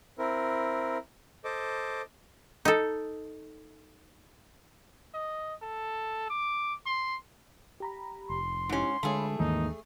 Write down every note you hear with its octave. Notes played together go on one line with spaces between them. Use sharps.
C4 E4 A#4
A4 C5 D#5 D6
D#4 A4
D#5
A4
D6
C6
G4 A#5 B5
F1 C6
G#2 C#4 D#4 E4 G4
D3 G#3 A3 G#4 C#5 F5 B5
D#2 G#2 D#3 E3 A#3 D#4